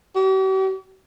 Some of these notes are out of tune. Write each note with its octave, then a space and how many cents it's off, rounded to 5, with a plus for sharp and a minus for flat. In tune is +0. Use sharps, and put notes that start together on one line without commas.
G4 -45